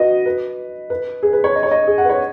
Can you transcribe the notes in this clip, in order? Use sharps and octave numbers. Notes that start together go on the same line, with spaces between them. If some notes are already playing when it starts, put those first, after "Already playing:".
Already playing: F#4 B4 D#5
B4
B4
G#4
B4
C#5
D#5
C#5
D#5
G#4
F#5
B4
C#5